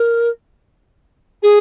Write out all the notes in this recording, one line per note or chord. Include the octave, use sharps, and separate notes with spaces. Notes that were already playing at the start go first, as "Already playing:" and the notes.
Already playing: A#4
G#4